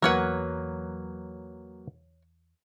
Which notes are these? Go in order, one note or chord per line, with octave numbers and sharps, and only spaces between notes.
E2 E3 F#3 A#3 A#4 B4 C#5 F#5